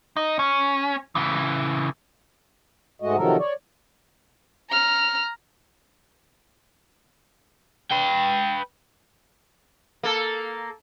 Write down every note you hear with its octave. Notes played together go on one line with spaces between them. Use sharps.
D#4
C#4
C#3 E3
G#2 G#3 A3 F#4 D#5
C3 D#3 F3 F#3 A4 A#4
C#5 D5
A#5 F6
B4 G5
A#3 A4